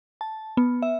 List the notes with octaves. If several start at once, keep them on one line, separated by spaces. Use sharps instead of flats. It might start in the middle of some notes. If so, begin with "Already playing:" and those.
A5
B3
E5